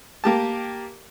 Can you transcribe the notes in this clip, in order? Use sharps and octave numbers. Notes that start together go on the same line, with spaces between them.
A#3 G4 A5